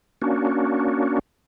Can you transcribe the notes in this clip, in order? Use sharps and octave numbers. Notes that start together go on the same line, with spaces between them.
A#3 C#4 D4 F#4